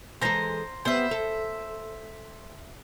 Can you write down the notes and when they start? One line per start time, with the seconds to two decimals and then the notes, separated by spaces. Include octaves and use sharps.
0.22 E3 G#3 A4 C5 A#5
0.85 G3 B3 C5 E5
1.11 A4